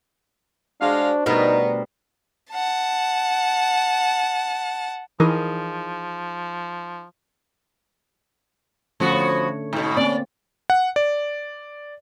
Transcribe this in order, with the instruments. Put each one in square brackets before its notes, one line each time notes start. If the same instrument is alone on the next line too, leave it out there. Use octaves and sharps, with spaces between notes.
[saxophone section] G#3 F5 [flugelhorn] D4 [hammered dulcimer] F#4 C5 D5
[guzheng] B2 A#4 [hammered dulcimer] D3 G3 A3 [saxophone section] B3 [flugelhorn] D#4
[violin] F#5 A5
[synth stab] E3 [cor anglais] F3 [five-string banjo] D#4 G#4 A#4
[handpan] D3 A3 C#4 [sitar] F3 B3 F#4
[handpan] C#5
[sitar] G#2 B2
[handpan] A#3 C4 [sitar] C#4 D5
[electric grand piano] F#5
D5